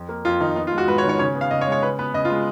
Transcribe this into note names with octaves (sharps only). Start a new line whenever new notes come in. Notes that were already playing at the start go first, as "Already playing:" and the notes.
Already playing: F2
A#3
F2 F4
D#3 D#4
B3 D#4
F4
G#3
F#4
G#2 B4
C#5
D#3
C#5
C#3 C#5
B3
F5
C#3 D#5
C#5
G#3
C#5
C#3 B4
B3 B4
C#3 D#5
F4
G#3